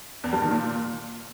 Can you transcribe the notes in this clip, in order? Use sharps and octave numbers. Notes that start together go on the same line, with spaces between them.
E2
G2
D#3
A#2